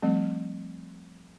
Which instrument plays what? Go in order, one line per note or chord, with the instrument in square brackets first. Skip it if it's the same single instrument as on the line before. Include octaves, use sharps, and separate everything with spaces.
[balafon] F3 G3 A3 C4